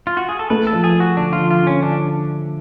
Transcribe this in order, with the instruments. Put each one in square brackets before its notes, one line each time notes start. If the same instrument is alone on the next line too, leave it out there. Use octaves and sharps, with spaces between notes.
[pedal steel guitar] F4
F#4
G#4
A4
[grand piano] A3 [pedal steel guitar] B4
[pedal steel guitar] A4
[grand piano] F3
[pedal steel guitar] G#4
[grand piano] F3
[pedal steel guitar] F#4
[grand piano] D3 [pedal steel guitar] D4
[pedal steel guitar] F4
[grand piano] F3
[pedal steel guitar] F4
[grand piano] D3
[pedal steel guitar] C#4
[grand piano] D3 [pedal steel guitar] D4